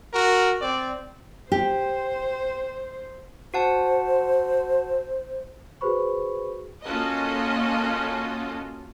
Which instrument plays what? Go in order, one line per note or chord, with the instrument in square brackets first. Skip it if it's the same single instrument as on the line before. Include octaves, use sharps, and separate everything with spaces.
[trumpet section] F#4 A#4
C4 D5
[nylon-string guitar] G4 [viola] C5
[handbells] F#4 F#5 A5 [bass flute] C5
[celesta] F#4 G#4 B4 C5 B5 C#6
[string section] A#3 C#4 F4 F#4 A4 D#5